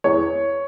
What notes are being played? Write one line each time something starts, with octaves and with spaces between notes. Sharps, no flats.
E2 C#5